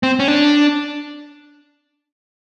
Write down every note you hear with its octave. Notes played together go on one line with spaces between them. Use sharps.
C4
C#4
D4